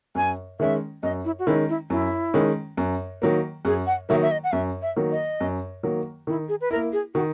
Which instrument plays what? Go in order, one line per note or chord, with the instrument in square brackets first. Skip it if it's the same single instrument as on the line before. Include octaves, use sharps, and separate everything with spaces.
[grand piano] F#2 [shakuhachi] G#5
[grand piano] D#3 G#3 C#4 [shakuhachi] E5
[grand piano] F#2 [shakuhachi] D#5
[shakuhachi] E4
F#4
[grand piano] D#3 G#3 C#4 [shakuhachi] E4
[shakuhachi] E4
[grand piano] F#2 [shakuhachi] E4
[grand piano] D#3 G#3 C#4
F#2
D#3 F#3 A#3
[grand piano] F#2 [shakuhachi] G#4
[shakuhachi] F#5
[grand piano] D#3 F#3 A#3 [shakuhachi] E5
[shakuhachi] E5
D#5
F#5
[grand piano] F#2 [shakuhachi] E5
[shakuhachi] E5
[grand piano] D#3 F#3 A#3
[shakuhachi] D#5
[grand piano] F#2
D#3 F#3 A#3
[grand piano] D#3 [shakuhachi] E4
[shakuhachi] G#4
B4
[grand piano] E4 [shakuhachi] A#4
[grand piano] A#3
[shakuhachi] G#4
[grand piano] D#3 [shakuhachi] F#4